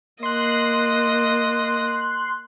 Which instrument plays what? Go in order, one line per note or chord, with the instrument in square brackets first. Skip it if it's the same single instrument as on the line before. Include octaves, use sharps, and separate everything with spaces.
[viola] A#3 D#5 [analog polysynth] C6 F#6